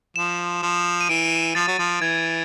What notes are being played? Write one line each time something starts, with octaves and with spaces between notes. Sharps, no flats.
F3 E7
F3
D#7
E3 D7
F3 A6
F#3
F3
E3 G#6